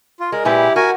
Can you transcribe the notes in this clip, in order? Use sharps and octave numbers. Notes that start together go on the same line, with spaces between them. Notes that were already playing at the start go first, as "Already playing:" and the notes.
F4
G#3 A#4
A#2 G#3 E4 G4 B4
F#4 A#4 G#5